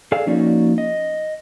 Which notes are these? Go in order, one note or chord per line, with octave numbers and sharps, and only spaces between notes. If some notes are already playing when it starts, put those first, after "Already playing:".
G#4 A4 D5 F5 G#5
F3 A#3 C#4 D#4 F#4 D5
D#5